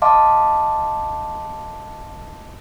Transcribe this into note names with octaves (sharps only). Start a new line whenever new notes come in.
D#5 F5 A5 C6 D6